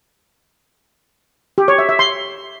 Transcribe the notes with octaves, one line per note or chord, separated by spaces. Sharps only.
G4
C#5
E5
E5
C6